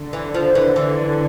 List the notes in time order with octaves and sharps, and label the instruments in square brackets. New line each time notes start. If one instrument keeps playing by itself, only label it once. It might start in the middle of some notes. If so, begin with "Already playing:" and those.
Already playing: [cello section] D3
[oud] E3
F3
E3
E3